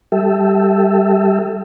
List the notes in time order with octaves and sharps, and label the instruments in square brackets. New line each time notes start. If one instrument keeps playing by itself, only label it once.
[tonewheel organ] G3 G4 A4 E5